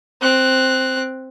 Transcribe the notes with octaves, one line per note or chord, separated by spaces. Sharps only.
C4 F#6